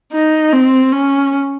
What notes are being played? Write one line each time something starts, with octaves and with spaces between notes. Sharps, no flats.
D#4
C4
C#4